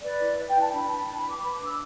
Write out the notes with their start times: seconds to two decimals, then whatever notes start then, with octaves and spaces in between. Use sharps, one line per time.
0.03 B4 D5
0.19 E4
0.37 B4
0.50 E4 G5
0.61 A5
0.72 D4 B5
0.89 D4
1.07 B4 A5
1.18 B5
1.25 B4
1.30 D6
1.42 B4 B5
1.53 D6
1.60 D4
1.66 E6